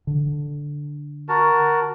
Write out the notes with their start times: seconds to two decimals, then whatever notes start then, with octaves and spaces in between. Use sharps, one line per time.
0.07 D3
1.29 F#4 A#4 A5